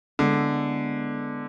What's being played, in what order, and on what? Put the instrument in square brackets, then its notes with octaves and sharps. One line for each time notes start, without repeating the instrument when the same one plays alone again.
[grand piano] D3 [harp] G#3 B3 E4